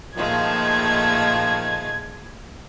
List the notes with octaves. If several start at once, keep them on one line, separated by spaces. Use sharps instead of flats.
A#2 D#3 F3 G#3 A3 F4 G#6